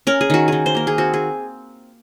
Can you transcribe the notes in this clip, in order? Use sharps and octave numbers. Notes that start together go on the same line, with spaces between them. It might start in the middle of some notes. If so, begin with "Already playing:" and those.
C#4 A#4
G#4
D#3 F#4
D#3 G#4
C5
A#3 A#4
G#4
C4 F#4
G#4